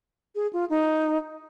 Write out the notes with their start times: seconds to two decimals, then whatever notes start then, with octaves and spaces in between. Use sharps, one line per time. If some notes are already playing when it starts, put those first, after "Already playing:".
0.35 G#4
0.53 F4
0.70 D#4